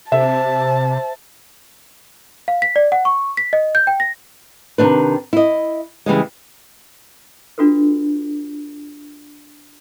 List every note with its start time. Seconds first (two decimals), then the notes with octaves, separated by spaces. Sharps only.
0.12 C3 C5 E5 A5
2.48 F5
2.62 B6
2.76 D5
2.92 F#5
3.05 C#6
3.37 B6
3.53 D#5
3.75 G6
3.87 G5
4.00 A#6
4.78 C3 D#3 D4 B4
5.33 E4 D#5
6.06 C#3 E3 G3 G#3
7.58 D4 F4 F#4 A4 B4